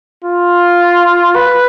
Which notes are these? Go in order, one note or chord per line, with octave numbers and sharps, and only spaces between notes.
F4
B4